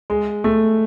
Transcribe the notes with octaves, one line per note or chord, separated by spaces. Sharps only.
G#3
A3